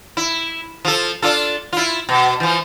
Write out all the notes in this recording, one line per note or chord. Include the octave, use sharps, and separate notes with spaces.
E4
F3 A4
D4 F4 A4
E4 F4
B2
E3 F3